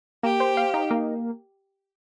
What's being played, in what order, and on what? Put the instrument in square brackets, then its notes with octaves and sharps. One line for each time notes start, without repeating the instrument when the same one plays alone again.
[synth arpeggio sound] A#3 [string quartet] G4
[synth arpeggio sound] C5
F5
D#4
A#3